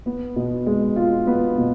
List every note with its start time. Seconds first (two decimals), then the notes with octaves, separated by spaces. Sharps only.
0.06 B3
0.36 B2
0.66 G#3
0.96 F4
1.27 B3
1.58 B2